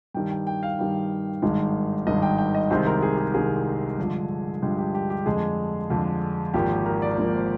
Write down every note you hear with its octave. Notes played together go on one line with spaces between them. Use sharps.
G2 D#3 G3 G5
G5
G5
F5
G2 D#3 G3
G#1 G2 D#3 G#3
G#1 G2 D#3 G#3 D#5
G5
G5
D#5
C2 C3 D#3 G#3 C5
A#4
G#4
G#4
C2 C3 D#3 G#3 G#4
G2 D3 F3 G#3
G2 D3 F3 G#3 G4
G4
G4
G4
F2 D3 G#3 G#4
F2 D3 G#3
G#1 G#2 F3 A#3 G4
A#4
D5
G#1 G#2 F3 A#3
C5